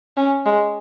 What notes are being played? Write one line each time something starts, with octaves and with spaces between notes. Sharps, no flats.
C#4
G#3